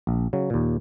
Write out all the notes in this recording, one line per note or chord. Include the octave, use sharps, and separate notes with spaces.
A#1
C#3 F#3
D#2 A#2